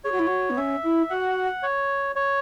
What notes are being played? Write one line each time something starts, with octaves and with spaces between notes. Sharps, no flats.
G#4 C#5
F#4
E4
F#4
B3
C#4 E5
E4
F#4 F#5
C#5
C#5